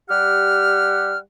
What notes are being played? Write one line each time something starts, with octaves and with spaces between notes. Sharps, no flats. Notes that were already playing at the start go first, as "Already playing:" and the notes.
G3 G4 F#5 F6